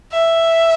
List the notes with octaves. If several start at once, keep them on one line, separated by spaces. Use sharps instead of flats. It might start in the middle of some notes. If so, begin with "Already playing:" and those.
E5